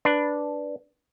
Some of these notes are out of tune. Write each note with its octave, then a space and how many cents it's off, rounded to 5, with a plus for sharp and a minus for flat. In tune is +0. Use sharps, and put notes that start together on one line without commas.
D4 +0 B4 +0